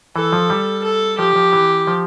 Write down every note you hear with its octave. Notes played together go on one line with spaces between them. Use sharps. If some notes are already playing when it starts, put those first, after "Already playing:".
E3 A4
F3
G3
A4
F3 G4
F3
E3
F3